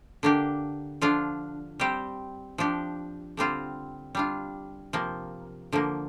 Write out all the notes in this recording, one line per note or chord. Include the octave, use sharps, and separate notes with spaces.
D3 A#3 D4 G4
D3 F3 D4 F4
G3 C4 G4
F3 D4 G4
D3 G3 C4 F4
G3 D4 F4
C3 F3 A#3
D3 F3 A#3